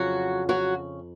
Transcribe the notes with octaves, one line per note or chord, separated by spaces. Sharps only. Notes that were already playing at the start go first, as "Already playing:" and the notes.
Already playing: F2 C#3 F#3 F#4
F#3 F#4